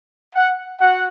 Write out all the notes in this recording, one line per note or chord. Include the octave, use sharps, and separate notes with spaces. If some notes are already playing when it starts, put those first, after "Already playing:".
F#5
F#4 F#5